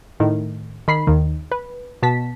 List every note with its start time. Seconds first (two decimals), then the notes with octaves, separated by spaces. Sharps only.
0.20 A2 D#3
0.88 D#3 B5 C7
1.07 D#2 D#3
1.52 B4
2.03 B2 A5 B6